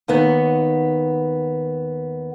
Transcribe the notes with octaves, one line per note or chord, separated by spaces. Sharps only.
D#2 D#3 B3 F#5